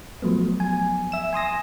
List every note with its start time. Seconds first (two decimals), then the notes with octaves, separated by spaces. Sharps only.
0.22 F3 F#3 A3 B3
0.60 G#5
1.12 E5 E7
1.33 G#5 C6 D#6 A#6